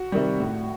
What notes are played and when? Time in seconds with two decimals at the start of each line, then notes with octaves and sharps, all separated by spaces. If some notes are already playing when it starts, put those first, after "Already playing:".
Already playing: F#4
0.12 C3 D#3 G3
0.40 A2